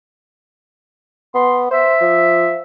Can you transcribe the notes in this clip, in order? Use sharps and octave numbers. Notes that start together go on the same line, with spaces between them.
B3 C6
C5 E5
F3